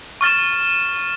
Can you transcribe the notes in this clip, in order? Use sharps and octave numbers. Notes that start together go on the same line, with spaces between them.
C#6 F6 A6 E7